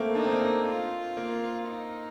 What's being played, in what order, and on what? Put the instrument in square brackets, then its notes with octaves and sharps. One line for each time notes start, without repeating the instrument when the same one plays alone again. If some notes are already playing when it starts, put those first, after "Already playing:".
Already playing: [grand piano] A3 A#3 C4
[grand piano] D4 [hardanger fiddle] D#4
[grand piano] C4
A#3
C4
[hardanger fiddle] F4
[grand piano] A#3
[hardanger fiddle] D#4